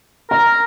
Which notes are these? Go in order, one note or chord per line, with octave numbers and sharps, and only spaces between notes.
A#4 A#5